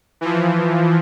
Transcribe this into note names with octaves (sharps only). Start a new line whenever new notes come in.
E3 F3